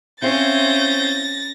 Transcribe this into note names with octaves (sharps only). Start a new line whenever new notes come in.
C4 C#4 E4 C5 F5 G6 A6 A#6